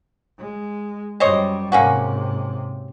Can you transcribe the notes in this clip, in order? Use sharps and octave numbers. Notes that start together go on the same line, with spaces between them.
G#3
F#2 G3 C5 C#5 D#5
G#2 C3 A#3 C#4 F#4